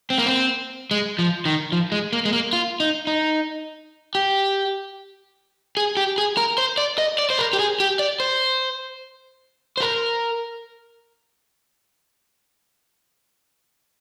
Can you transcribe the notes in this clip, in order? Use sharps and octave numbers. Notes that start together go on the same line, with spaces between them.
C4
A#3
C4
G#3
F3
D#3
F3
G#3
A#3
G#3
A#3
F4
D#4
D#4
G4
G#4
G4
G#4
A#4
C5
D5
D#5
D5
C5
A#4
G4
G#4
G4
D5
C5
C5
A#4